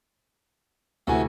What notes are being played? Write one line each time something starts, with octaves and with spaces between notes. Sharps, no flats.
D2 C3 E3 A3 F#4 G#5